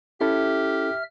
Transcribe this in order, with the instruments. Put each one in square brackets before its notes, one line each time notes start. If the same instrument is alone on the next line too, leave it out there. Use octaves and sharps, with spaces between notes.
[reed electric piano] C#4 E4 A4 [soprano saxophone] G4 [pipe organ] E5 F6